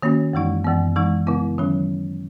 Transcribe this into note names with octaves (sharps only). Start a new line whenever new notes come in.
D#3 A#3 C#4 F#4
F#2 E3 G#3 D#4
F#2 E3 B3
E3 G#3 D#4
C#3 G#3 B3 E4
D#3 F#3 C#4